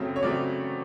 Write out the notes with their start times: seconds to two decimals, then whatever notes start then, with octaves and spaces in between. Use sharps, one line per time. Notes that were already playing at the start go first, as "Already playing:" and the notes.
Already playing: F#2 C#3 F#3 A3 C4
0.16 C#5
0.23 C#3 F#3 A3 C4 D5